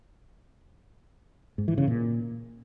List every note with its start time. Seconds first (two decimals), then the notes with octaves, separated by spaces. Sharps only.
1.58 G#2
1.68 E3
1.78 C#3
1.87 A#2